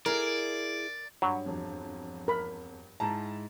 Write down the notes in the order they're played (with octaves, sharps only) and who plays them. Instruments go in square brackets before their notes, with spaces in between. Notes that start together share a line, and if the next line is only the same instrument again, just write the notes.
[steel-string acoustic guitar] E4 G#4 [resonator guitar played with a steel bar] A#4 [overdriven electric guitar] D5
[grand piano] G2 [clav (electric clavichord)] F#3 [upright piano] B5 C#6
[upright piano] E1 F2
[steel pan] A#4 B5
[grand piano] G#2 E4 A#5 [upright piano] A5